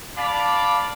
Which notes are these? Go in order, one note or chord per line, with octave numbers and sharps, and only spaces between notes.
D4 D5 F5 A5 B5